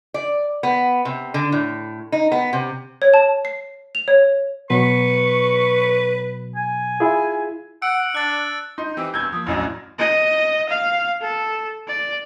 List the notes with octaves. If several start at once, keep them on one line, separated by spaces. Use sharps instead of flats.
D5
B3
C3
D3
A2
D#4
B3
C3
C#5
A5
C7
F7
C#5
B2 F#3 B4 C#6
G#5
E4 F4 G#4
F#5 E6 C#7 D7
D4 F#6 A6
D#4 C6 G6
E3 C4 G4 E6
E2 G2 E6 G6 G#6
F3 A#3 D#6
A1 F#2 F#3 D4 E4 D#5
D#5
F5
A4
D5